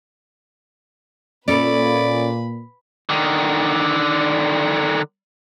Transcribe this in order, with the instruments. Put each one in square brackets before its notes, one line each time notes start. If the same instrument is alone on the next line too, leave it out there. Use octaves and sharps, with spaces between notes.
[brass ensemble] A#2 [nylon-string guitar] C#4 A4 C#5 [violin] B4 B5 [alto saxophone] D5
[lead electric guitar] D3 D#3